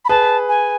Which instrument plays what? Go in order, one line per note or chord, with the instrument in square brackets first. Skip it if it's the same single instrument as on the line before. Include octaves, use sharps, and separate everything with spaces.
[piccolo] B5
[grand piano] G#4 B4 [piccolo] A5
[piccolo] G#5